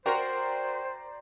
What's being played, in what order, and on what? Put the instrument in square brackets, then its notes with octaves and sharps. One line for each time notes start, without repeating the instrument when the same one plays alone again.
[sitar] F#4 A#4 [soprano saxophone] C5 [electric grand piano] D5 A#5 C6 [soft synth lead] G5